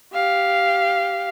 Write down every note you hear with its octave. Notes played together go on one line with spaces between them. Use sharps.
G4 F5